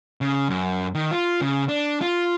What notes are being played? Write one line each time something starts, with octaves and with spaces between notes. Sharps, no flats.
C#3
F#2
D#3
F4
C#3
D4
F4